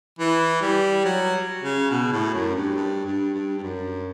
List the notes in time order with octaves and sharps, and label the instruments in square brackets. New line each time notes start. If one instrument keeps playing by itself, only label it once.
[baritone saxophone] E3
G3
F#3
C#3
B2
A2
F#2
G2
G2
G2
G2
G2
F#2